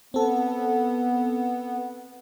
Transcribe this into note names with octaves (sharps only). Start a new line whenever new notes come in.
B3 C4 A4